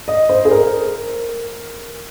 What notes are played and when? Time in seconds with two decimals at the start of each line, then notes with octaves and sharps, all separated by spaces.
0.08 D#5
0.29 C5
0.45 G#4
0.51 A#4